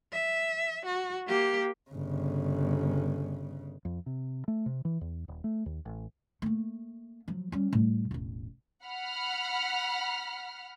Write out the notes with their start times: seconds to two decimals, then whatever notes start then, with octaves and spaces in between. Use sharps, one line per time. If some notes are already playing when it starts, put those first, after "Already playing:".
0.12 E5
0.85 F#4
1.27 A#3 G4
1.91 G1 C#3
3.85 F2
4.06 C3
4.48 A3
4.66 C3
4.85 E3
5.01 E2
5.28 D#1
5.44 A3
5.66 D#2
5.85 A1
6.42 A3 A#3
7.28 F3 F#3
7.52 G3 C#4
7.73 A2 G3
8.11 E1 A1
8.85 F#5 B5 F6